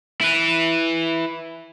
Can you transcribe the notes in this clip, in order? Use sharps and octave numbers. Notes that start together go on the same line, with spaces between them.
E4 B4